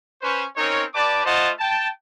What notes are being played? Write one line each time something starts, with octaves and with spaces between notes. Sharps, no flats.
C#4 B4 C5
C4 C#4 D#4 A#4 C#5
G4 B4 D5 A5 D6
A3 F4 C5 D#5 F#5 A5
G5 A5